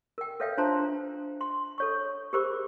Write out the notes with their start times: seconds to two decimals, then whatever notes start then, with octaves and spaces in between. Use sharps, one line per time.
0.18 A#4 G5
0.40 A4 B4 C#5 E5 F5 G5
0.58 D4 F4 C5 A5 A#5 C6
1.41 C6
1.78 A4 C#5 C#6
2.33 G4 G#4 A#4 C5 B5 D6